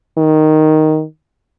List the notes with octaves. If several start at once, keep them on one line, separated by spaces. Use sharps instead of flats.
D#3